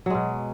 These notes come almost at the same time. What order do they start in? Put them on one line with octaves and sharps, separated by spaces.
F#3 G#3 B2